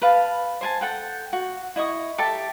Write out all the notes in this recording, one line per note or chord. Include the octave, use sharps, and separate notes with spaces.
B4 F5 A5
C5 G#5 A5
A4 F#5 G5
F#4
E4 D#5 C#6 D#6
G4 A4 E5 A5